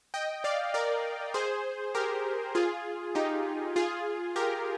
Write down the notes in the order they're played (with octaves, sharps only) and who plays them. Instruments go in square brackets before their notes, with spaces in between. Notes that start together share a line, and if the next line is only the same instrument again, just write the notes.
[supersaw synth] D#5 G5
D5 F5
A#4 D5
G#4 C5
G4 A#4
F4 G#4
D#4 G4
F4 G#4
G4 A#4